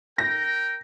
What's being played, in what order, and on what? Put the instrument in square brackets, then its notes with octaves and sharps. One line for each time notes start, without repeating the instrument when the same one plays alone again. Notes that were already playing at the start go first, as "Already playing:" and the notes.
[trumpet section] A#4 G5 [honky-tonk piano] A#6